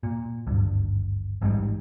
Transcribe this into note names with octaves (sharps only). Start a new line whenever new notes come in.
A#2
G#1 D2 G2
A1 G#2 B2 G3